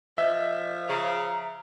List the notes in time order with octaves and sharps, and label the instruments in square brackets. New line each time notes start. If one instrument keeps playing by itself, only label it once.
[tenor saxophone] F3 [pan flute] D#5 [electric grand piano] E5
[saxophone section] C#3 [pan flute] A#5